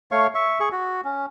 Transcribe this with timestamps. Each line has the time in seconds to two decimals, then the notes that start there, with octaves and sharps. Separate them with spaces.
0.12 A3 C#5 F5 C#6
0.35 E5 C#6
0.60 G#4 C#6
0.72 F#4
1.05 C#4